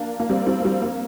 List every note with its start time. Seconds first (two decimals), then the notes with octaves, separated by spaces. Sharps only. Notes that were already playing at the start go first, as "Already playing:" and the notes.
Already playing: A#3 D4
0.20 A#3
0.30 G3 C4
0.47 G3 C4
0.60 A#3
0.65 G3
0.82 A#3